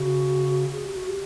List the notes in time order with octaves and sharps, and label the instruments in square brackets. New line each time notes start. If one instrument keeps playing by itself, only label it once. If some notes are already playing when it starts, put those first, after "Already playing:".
Already playing: [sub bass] C#3 [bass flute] F#4
[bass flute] G#4
G4
F#4
G4